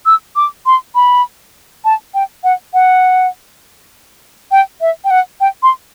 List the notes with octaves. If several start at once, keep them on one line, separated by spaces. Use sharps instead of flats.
E6
D6
C6
B5
A5
G5
F#5
F#5
G5
E5
G5
F#5
G5
C6